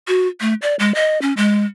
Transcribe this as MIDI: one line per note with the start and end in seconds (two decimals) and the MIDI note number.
0.08 0.28 66
0.41 0.54 57
0.62 0.75 74
0.79 0.92 56
0.95 1.20 75
1.22 1.33 61
1.37 1.64 56